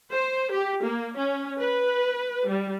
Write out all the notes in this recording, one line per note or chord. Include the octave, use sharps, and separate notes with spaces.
C5
G4
A#3
C#4
B4
G3